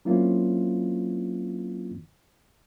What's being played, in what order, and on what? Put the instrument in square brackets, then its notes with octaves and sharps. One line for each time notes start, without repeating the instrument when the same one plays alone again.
[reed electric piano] F#3 A#3 C4 C#4 E4 F4